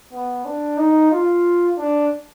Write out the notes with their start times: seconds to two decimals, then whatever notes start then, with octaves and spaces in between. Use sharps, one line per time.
0.12 B3
0.45 D4
0.78 D#4
1.11 F4
1.77 D4